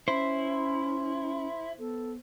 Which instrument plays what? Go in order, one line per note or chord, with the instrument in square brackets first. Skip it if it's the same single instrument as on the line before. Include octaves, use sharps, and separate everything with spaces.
[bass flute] C#4 [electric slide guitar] E4 [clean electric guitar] C5 [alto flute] C6
[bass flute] B3 [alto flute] A4